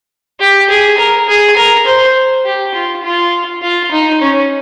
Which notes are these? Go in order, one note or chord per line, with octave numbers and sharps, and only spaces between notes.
G4
G#4
A#4
G#4
A#4
C5
G4
F4
F4
F4
D#4
C#4